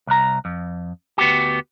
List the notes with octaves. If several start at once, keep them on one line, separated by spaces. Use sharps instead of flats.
C2 A#5
F2
D2 B3 F#4 G4